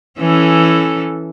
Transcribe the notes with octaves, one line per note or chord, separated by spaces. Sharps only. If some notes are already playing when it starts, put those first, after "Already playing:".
E3 C#4 A4